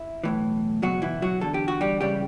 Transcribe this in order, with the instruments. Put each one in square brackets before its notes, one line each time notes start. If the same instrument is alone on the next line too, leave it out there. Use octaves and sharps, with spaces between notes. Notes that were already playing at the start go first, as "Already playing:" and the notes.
Already playing: [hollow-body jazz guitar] E4
B1 A2 E3
C#2 B2 F#3 F#4
E3 E4
F#3 F#4
E2 D3 A4
G4
F#4
G3 G4
C#2 C#3 E3 G3 G4